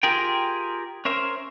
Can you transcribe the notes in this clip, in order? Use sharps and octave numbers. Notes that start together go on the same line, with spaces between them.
F4 G4 G#4 A#4 G5
C#4 A#4 C5 E5